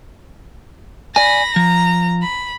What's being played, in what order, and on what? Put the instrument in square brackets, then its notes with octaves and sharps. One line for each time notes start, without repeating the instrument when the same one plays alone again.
[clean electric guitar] D5 G#5 [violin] B5 A#6
[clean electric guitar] F3 [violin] A#5
[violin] B5